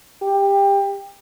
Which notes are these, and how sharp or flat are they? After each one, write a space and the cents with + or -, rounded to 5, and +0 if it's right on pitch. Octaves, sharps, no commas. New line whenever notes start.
G4 +20